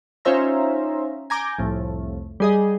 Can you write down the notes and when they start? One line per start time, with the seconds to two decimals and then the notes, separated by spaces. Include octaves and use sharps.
0.25 C#4 D#4 F4 C5 E5 A#5
1.30 G#5 A#5 D6 G6
1.58 C2 F2 A2
2.40 G3 G#4 D#5